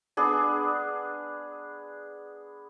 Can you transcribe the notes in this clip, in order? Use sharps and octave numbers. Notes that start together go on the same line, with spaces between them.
B3 D4 G#4